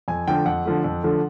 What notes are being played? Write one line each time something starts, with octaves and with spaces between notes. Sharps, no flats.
F2 G#5
D3 F3 A3 G5
F2 F#5
D3 F3 A3
F2
D3 F3 A3